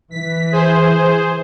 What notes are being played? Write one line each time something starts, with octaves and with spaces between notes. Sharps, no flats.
E3 B6
G#4 C5